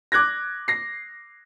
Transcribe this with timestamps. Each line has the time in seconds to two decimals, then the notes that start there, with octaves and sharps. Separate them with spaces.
0.12 D6 F#6 G#6 A#6
0.68 A#6 C7